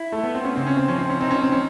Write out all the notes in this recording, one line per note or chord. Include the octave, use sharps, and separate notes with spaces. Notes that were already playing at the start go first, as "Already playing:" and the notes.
Already playing: E4
A3
B3
C4
C#4
C#3 C4
C#4
C4
F3 C#4
C4
C#4
C4 D#4
C#4
C4
C#4